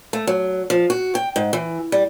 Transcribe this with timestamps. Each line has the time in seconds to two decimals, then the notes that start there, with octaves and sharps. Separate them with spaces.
0.13 A3
0.27 F#3
0.70 F3
0.90 F#4
1.15 G5
1.36 G#2
1.53 E3
1.92 G3